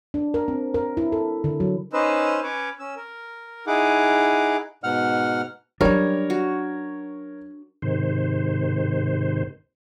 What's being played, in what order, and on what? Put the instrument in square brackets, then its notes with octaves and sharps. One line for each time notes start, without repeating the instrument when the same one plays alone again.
[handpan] D4
A#4
C4
A#4
E4
A4
D3
F#3
[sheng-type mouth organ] C#4 D#4 B4 C5 D#5 E6
C#4 B4 C#5 D6
C#4 E6
A#4
D#4 E4 G#4 F#5 D6
[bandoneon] G#2 B2 F#5 F6
[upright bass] F#3 C#4 [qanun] G3 [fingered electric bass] D4 [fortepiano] A#4 C#5
[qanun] F#4
[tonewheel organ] G#2 C3 D#3 C5